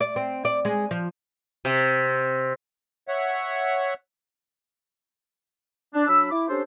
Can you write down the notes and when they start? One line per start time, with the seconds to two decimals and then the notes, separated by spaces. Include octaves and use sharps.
0.01 D5
0.16 C4
0.45 D5
0.65 G#3
0.91 F3
1.65 C3
3.08 C#5 E5 F#5
5.95 D4
6.08 F#3 D4 B5 E6
6.31 E4 D6
6.49 C#4 D4 G4 A4 C5